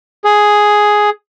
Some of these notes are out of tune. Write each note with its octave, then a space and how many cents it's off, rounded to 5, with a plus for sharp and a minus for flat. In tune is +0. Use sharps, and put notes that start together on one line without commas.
G#4 +5